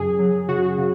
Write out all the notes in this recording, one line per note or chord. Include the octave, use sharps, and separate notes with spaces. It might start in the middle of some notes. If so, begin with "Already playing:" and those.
Already playing: F#2 C#3 F#3 G#4
F#3
C#3 F#4
C#3